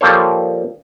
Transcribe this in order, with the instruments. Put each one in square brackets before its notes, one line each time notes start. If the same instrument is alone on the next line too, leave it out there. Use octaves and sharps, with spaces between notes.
[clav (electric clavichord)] F3 G3 A#3 A4 C5 C#5